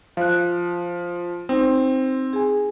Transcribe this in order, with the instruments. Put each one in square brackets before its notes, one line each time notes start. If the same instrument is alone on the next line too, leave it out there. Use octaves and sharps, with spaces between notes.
[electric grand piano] F3 [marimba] F5 F#6
[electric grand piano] C4 [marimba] D#4
[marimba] G#4 G#5